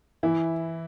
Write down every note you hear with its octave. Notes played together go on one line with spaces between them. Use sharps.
E3 E4